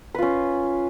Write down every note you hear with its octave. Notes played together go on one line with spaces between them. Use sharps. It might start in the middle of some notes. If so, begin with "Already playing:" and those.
C#4 F4 B4